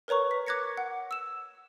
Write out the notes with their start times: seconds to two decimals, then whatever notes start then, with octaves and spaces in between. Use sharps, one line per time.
0.08 A#4 B4 C#5 A#5 C#6
0.31 B6
0.47 D6 F#6 G#6 A#6 C#7
0.77 F#5
1.11 E6 E7